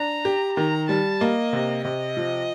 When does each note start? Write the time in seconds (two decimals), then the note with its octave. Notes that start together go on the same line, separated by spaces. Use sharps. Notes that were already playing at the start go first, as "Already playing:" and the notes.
Already playing: D4 A#5
0.25 G4
0.57 D#3 A#5
0.89 G3 A5
1.21 A#3 D#5
1.53 C3
1.84 C3 D#5
2.17 F3